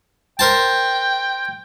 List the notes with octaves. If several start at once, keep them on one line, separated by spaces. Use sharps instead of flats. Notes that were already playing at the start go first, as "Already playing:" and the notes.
A#4 C5 G5 A5